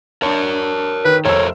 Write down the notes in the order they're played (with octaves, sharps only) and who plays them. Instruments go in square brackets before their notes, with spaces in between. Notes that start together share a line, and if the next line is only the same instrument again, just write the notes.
[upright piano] D4 A5 [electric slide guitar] A#4 C#5
[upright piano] D#3 [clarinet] B4
[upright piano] F1 E6 [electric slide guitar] A4 A#4 C5 [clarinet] C#5